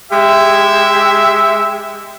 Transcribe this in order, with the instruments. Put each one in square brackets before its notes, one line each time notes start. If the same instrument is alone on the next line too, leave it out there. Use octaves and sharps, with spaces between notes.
[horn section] G#3 G4 E5